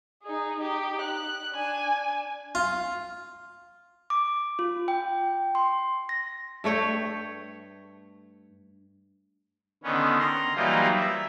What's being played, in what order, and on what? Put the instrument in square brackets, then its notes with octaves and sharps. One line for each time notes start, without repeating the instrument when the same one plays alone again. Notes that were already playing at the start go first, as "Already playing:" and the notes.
[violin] D#4 G#4
D#4 G4
F#6
D4 G#5
[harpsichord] F4
[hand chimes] D6
F4
G5
C6
A#6
[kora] G2 A3 C#5 G5
[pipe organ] D3 D#3 B3 C#4
A#5 C6
E3 F#3 G3 A#3 D#4 F4
E5